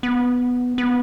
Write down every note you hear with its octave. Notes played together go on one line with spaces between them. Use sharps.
B3
B3